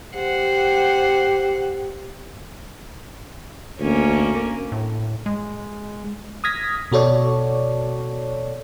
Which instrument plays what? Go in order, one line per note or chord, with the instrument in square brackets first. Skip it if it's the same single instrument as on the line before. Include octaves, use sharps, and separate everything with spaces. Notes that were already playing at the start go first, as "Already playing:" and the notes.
[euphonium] G4 [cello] C5 F#5
[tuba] D2 [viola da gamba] A#3 C#4
[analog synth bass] A2
G#3
[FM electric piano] D#6 F6 G#6 A#6 B6
B2 F#4 A4 C#5 D5